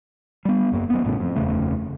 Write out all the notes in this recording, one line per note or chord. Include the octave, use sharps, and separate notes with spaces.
G3 B3
F#1 F#2 A#3
F#2 B3
A1 A2 C#3
F2
F#1 E2 C#3 A3